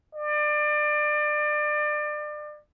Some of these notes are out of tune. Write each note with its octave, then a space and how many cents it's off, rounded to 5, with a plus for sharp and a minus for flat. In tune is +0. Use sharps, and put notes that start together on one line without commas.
D5 +30